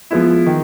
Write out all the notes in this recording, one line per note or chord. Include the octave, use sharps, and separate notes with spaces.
F3 G#3 B3 E4
D#3